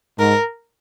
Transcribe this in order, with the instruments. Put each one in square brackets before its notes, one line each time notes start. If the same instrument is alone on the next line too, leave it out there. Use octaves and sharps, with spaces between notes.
[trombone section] G#2 [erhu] A#4